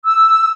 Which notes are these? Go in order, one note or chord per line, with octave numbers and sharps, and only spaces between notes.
E6